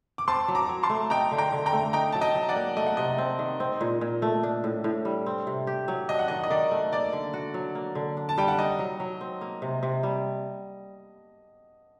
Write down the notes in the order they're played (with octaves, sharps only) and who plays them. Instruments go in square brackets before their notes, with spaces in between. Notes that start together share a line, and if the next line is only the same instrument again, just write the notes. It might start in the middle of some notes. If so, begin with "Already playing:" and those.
[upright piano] D6
[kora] C4 [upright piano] A5 C6
[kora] F#3
[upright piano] A#5 D6
[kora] F#3
[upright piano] A5 C6
[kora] A3
[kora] D#4 [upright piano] G5 A#5
[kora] D3
[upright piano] G5 A#5
[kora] D3
[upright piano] G5 A#5
[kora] A3
[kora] D#4 [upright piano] G5 A#5
[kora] F#3 [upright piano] A5
[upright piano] D#5 G5
[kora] F#3
[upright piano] D5 F#5
[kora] A#3
[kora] A3 [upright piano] D#5
[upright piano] F#5
[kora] C3 [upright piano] D#5
[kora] C4
D#3
C4
A#2
A#2
A3
D4
A2
A2
G3
C4
C3
G4
F#3
[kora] D4 [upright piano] D#5
[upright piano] F#5
[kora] D#3 [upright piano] D#5
[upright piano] D#5
[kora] D#3 [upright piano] D5
[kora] A3
[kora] A#3 [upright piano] D5
[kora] D3
F#4
F#3
A#3
D3
D4
[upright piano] A5
[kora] G3 [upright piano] G5
[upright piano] F#5
[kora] D#4 [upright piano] D#5
[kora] F#3
F#3
C4
A#3
C3
C3
G3